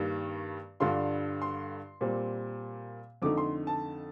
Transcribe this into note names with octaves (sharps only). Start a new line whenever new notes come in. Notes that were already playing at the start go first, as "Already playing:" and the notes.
Already playing: G2 D#3 G3 A#3 D4
G2 D3 G3 D4 F4 C6
C6
A#2 G3 C4
F2 D3 A3 D#4 D6
C6
A5